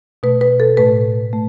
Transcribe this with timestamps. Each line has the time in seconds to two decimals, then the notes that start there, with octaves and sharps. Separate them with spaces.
0.23 B2 A3 B4
0.41 B4
0.60 A4
0.77 A2 A3 B4
1.33 A3